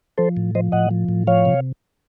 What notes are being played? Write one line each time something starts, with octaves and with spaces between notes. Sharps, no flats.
F3 A4 C5
A2
F3 C5 D#5
A2 D#5 F#5
F3
A2
F3 C#5 F5
C3